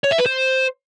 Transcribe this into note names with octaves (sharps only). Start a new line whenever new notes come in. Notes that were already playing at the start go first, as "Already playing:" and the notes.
C#5
E5
B4
C5